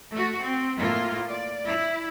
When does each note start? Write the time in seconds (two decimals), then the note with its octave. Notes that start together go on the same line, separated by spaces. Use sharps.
0.12 A3 F#4
0.42 C4
0.78 A2 A#3 F4
1.30 D5
1.65 E4